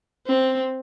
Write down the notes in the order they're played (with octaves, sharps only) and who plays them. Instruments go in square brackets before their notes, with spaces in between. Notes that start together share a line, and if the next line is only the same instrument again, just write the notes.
[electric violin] C4